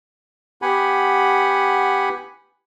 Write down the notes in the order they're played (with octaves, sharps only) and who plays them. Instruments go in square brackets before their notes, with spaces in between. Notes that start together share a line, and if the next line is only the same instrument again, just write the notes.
[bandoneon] B3 G4 F#5 G#5 B5